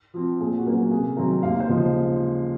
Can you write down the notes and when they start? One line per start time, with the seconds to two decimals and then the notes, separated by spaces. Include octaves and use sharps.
0.14 F3 C4
0.40 A#2 G#4
0.58 F#4
0.66 F#3 A#3 C#4
0.74 F#4
0.91 C3 G#4
1.17 D#3 F#3 C4 A#4
1.43 D#2 F5
1.60 C5
1.69 C#3 F3 G#3